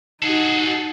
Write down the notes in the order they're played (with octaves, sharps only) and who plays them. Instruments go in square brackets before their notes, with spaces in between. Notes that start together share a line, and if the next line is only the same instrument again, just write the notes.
[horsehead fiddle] D#4 F#4 [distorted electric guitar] G#4 A4